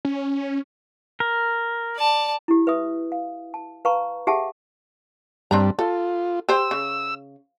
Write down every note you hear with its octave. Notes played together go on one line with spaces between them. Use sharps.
C#4
A#4
D5 A5
E4 G4
B4 E5 D#6
F5
A5
B4 F5 A5 A#5 C#6
G4 G#4 E5 F#5 A5
G2 G3 C4 D4 A#5
F4 A4
G4 C5 E6
C#3